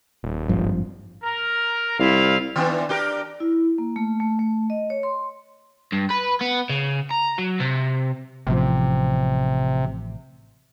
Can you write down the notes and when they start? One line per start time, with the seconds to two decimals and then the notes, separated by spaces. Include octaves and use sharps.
0.23 D#1
0.49 G#1 G2 F3
1.23 A#4
1.99 C2 E4 F4 F5
2.56 D#3 B3 D4
2.89 D4 G4 A#4
3.40 E4
3.78 A#3
3.96 A3
4.20 A3
4.39 A3
4.70 D#5
4.90 C#5
5.03 C6
5.93 G2
6.11 B4
6.41 B3
6.70 C#3
7.11 A#5
7.38 F#3
7.60 C3
8.47 A1 C3 F3